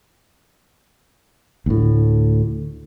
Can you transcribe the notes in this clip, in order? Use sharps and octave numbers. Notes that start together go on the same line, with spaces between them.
D2 A2